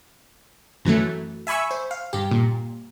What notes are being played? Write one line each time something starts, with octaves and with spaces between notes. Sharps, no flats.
F#2 E3 F#3 A3
E5 G#5 B5 C#6 E6
C5
F5
G2 G4
A#2